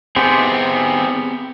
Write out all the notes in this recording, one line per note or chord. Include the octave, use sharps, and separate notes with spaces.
B3 C4 G4 G#4 C5